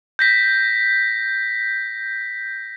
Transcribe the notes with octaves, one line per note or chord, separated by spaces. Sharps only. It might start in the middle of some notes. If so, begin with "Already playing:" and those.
G6 A#6 B6